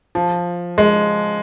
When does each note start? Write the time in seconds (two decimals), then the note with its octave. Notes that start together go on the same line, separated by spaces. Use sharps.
0.15 F3
0.78 G#3